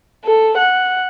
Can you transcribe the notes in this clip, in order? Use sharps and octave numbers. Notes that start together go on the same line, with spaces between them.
A4
F#5